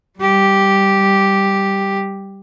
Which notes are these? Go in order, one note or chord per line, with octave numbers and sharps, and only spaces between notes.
G3 G4